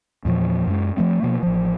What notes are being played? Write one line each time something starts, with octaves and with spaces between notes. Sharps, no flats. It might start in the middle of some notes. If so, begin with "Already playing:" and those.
E2 A#2 F3
F#2 G#3
F3 G3 A3 C4
B2 F3 A#3
A1 F3